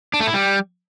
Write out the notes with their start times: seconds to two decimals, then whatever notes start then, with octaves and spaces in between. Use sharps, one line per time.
0.14 D4
0.20 A3
0.27 E4
0.34 G3